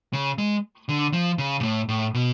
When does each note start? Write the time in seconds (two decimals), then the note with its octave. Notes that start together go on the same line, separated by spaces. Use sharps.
0.13 C#3
0.38 G#3
0.89 D3
1.13 F3
1.38 C#3
1.60 G#2
1.63 A2
1.89 A2
2.14 B2